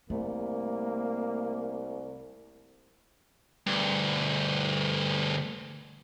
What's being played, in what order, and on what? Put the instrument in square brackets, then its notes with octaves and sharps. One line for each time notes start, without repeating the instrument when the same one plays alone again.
[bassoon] C2 [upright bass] A3 [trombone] A#3
[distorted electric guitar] D2 G2